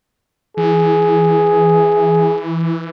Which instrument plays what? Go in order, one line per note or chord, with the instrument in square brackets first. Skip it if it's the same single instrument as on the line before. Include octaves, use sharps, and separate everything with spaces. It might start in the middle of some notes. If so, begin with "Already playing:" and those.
[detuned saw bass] E3 [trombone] G#4